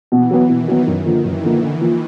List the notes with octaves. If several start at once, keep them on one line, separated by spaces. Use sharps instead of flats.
B2 E3
F#3 B3
B2 D#3
F#3 B3
F#2
D3 F3 A#3
F#2 E3
D3 F3 A#3
D3
F3 A#3